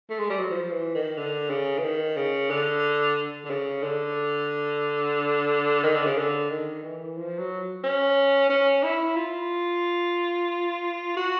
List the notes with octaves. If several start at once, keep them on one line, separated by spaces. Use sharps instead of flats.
A3
G#3
G3
F#3
F3
E3
D#3
D3
C#3
E3
D#3
C#3
D3
D3
C#3
D3
D#3
D3
C#3
D3
D#3
E3
F3
F#3
C#4
C#4
E4
F4
F#4